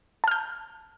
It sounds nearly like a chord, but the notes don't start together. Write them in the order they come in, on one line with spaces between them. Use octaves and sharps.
A5 F6 G6